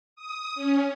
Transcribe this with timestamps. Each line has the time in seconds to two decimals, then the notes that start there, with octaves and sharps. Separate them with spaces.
0.16 D#6
0.55 C#4